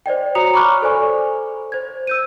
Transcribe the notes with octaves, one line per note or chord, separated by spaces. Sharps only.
C5 D5 D#5 G5
F#4 C#5 A#5 D#6 C#7 F7
A#5 B5 C#6 D6 F6 F#6
A4 C5 D5 G#5 C#6
C5 G#6
E6 G6 D#7